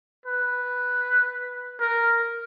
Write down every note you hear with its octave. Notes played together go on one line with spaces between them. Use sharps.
B4
A#4